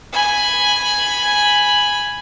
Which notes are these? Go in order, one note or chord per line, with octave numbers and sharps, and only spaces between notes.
G#5 B5